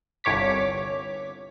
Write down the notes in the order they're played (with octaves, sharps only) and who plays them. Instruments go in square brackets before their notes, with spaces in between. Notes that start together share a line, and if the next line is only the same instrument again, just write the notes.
[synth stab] G1 C2 C#5 D6 B6